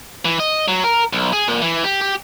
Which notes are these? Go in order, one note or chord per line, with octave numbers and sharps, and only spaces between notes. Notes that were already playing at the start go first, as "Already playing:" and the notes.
E3
D#5
F#3
A#4
B1
G#4
A#2
E3
G4
G4